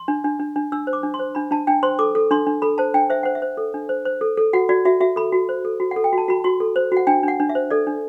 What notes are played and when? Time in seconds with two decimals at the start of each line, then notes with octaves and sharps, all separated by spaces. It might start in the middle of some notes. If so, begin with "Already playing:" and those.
Already playing: C6
0.08 D4
0.24 D4
0.40 D4
0.56 D4
0.72 D4 E6
0.87 C5
0.93 D6
1.03 D4
1.14 C6
1.19 C5
1.35 D4 B5
1.51 D4 A5
1.67 D4 G5
1.83 C5 C6
1.99 A4 D6
2.15 A4
2.31 D4 C6
2.46 D4
2.62 A4 B5
2.78 C5 A5
2.94 D4 G5
3.10 C5 E5
3.23 C5 F#5
3.35 E5
3.42 C5
3.57 A4
3.74 D4
3.89 C5
4.05 C5
4.21 A4
4.37 A4
4.53 F#4 F#5
4.69 F#4 D5
4.85 F#4 E5
5.00 F#4 E5
5.16 A4 B5
5.33 F#4
5.49 C5
5.65 A4
5.80 F#4
5.91 F#5
5.96 A4
6.04 G5
6.13 F#4
6.18 A5
6.28 F#4 B5
6.44 F#4 C6
6.60 A4
6.76 C5
6.92 F#4 F#5
7.07 D4 G5
7.23 D4 F#5
7.40 D4
7.49 E5
7.55 C5
7.71 A4 D5
7.87 D4